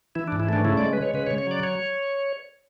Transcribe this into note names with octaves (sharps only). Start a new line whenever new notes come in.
E3 E4
D4
G#2
E4
A3 D4
C#3 E4
G#3 D5
B4
G#3 C#5
C#3 B4
C#5
C#3
C#5
F#3 D5
C#5